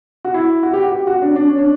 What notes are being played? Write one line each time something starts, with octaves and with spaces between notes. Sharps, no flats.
F#4
E4
F#4
G4
F#4
G4
F#4
D4
D4
C#4
D4